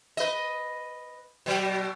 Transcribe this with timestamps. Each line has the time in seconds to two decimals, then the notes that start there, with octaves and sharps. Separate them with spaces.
0.17 B4 D#5
1.46 B2 F#3